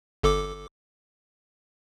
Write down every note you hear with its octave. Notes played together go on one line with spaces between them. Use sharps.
G1 A4 D6